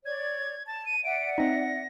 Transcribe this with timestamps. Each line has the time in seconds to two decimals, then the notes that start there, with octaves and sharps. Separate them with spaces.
0.05 C#5 D5 G#6
0.67 A5 A6
0.85 D#7
1.03 D5 E5 F#5 D7
1.38 C4 D#4 A#6